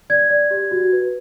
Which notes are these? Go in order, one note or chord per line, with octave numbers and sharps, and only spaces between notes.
D5 G#6
D5
G4
F#4
B4